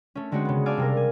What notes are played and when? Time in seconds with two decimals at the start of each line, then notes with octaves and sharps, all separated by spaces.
0.15 A3 C#4
0.31 D3 G#3 C4 C#4 F#4
0.45 C#3 B3
0.66 D5 F5 G#5 A5 D6 E6
0.77 C3 G3 A#4
0.97 G#5